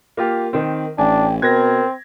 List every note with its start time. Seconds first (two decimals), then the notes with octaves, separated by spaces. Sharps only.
0.17 A#3 F4 G4
0.53 D#3 C4
0.98 A1 D4 G5 G#5
1.42 B2 C4 A#4 G#6 A#6